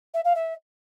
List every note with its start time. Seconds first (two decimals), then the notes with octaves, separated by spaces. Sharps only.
0.14 E5
0.25 F5
0.35 E5